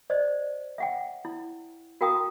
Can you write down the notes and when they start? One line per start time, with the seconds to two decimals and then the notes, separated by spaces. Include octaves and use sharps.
0.10 C5 D5 D#5
0.78 E5 F#5 G5
1.25 E4
2.01 F#4 A#4 F5 G5 A#5 D#6